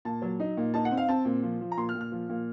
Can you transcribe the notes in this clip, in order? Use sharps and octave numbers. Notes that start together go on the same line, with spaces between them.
A#2 A5
F#3
D#4
A#2
D#4 A5
F#5
C4
F5
C4 A5
A#2
F3
F3
A#5
A#2 C6
F6
A#2
F6
F3
A#2